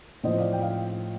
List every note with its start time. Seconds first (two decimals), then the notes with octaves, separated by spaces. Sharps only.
0.23 A2 F3 C5 D#5
0.38 D5 F5
0.53 G5
0.61 F5